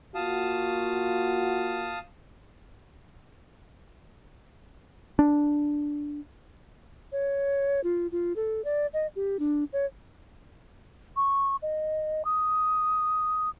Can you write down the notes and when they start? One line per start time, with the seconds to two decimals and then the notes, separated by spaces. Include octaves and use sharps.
0.15 A#3 F4 F#4 F5 A5 D#6
5.19 D4
7.12 C#5
7.84 F4
8.12 F4
8.36 A4
8.65 D5
8.93 D#5
9.16 G4
9.39 D4
9.73 C#5
11.16 C#6
11.62 D#5
12.25 D#6